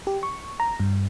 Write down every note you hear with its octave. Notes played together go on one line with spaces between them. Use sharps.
G4
C#6
A#5
G2